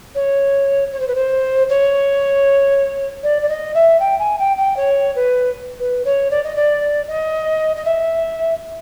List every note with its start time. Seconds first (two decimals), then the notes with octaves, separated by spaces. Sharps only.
0.15 C#5
0.92 C#5
1.00 C5
1.08 B4
1.15 C5
1.69 C#5
3.23 D5
3.42 D5
3.49 D#5
3.74 E5
4.00 G5
4.19 G#5
4.39 G5
4.57 G5
4.77 C#5
5.15 B4
5.79 B4
6.05 C#5
6.31 D5
6.44 D#5
6.56 D5
7.08 D#5
7.76 D#5
7.85 E5